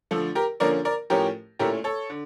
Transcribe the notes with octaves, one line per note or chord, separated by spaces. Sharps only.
D3 F3 A3 A4
G4 A#4
D3 F3 A#3 C#4 A#4 D5
A#4 D5
A2 F3 C#4 G4 A#4
A#2 A3 C#4 E4 G4 A#4
A4 C#5
D3